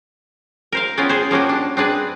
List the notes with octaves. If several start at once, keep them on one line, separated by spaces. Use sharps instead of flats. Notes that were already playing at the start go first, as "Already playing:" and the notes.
A#4 C5 F5
B3 C#4 E4 F4 G5 G#5
G#4 C5
F3 A#3 C#4 F#4 G4
D4
C4 D4 G#4 B4